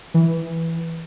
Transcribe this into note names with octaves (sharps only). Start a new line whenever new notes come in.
E3